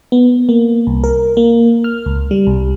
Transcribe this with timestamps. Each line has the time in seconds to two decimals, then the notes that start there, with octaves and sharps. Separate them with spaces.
0.12 B3
0.49 A#3
0.87 C2
1.04 A#4
1.37 A#3
1.84 F6
2.06 C#2
2.31 G3
2.47 C2